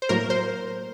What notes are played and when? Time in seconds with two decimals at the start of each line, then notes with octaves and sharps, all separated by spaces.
0.02 C5
0.09 A2 F#3 A#3 A#4
0.30 C5